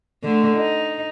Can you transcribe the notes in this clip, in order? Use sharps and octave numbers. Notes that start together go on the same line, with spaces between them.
D3 A3
D#4